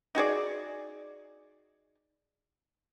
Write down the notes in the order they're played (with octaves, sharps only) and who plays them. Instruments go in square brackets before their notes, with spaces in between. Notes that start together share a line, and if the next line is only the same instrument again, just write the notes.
[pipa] D#4 F#4 G#4 D5